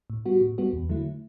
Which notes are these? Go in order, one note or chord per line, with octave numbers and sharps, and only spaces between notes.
A2
G3 B3 F#4
A2
G3 B3 F#4
E2
D3 F#3 A3 E4